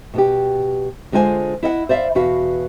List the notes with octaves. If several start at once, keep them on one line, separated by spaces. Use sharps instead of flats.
B2 B3 G4
D3 G#3 F4 C5 G#5
E4 D#5 E5 F#5
C5 D5 E5 F5
E2 B2 F#4 B4 F5